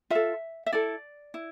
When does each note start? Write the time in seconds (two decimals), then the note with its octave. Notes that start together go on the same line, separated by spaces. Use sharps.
0.10 F4 A4 E5
0.66 E5
0.73 E4 A4 D5
1.34 E4